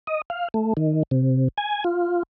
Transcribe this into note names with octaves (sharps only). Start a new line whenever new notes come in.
D#5
F5
A3
D#3
C3
G#5
F4